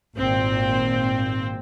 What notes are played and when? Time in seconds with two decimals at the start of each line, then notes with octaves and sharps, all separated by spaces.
0.17 G#1 A#2 C4